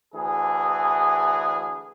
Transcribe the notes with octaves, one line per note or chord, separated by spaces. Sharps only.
D2 E3 G#4